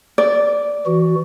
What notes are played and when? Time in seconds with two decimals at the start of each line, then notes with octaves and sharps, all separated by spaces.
0.18 D5
0.86 E3 F#4